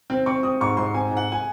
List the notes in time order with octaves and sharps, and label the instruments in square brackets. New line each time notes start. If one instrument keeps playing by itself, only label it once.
[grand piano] C4
[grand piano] C4 [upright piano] C#6
[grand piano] C4 [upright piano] D#6
[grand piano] G#2 [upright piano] C#6
[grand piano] G#2 [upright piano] C6
[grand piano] C4 [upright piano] G#5
[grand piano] G#2
[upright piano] F#5
G#5